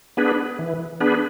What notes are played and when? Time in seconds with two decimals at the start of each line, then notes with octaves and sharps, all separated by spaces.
0.17 B3 D4 G#4 B4
0.59 E3
1.00 B3 D4 G#4 B4